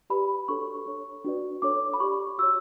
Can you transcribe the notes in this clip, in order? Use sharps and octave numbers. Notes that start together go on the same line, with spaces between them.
G4 B4 D5 B5
D4 F#4 A4 C#5 C#6
D4 A4 C#5
D4 F#4 B4 D5
D4 A4 C#5 D6
B5
G4 D5 C#6
F#4 C#5 E6